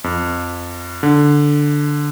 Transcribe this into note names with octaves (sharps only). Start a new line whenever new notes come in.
F2
D3